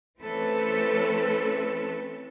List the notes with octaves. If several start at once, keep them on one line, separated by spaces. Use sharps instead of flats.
E3 A3 C4 C#4 A4 B4